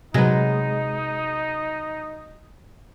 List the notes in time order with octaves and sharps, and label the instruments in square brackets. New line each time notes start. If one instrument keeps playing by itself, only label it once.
[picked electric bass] C3 [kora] F#3 B4 [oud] G#3 [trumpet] D#4